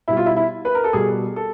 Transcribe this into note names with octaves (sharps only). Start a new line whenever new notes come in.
B2 G3 E4
F4
E4
E4
B4
A#4
A4
B2 G3 G#4
A4